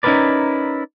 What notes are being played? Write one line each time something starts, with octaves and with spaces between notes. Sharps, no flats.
C#4 D#4 E4 A#4 B4 D5